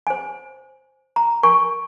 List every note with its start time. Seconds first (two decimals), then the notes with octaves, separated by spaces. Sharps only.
0.07 C5 G#5
1.16 A#5
1.43 A#4 G#5 C#6